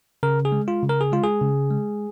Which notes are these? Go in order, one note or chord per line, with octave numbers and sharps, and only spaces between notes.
C#3 A#4
G#4
G#3
F4
C#3
A#4
G#4
G#3 F4
G#4
C#3
G#3